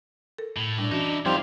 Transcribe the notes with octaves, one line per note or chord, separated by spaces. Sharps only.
A4 A#4
A2
A#2 G3 D4
E3 C#4 D#4 E4 F#4
F3 G3 C4 D#4 E4 F5